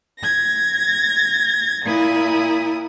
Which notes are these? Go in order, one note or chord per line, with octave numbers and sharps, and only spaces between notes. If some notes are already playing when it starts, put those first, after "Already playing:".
G#6 A#6
A#2 E4 D#6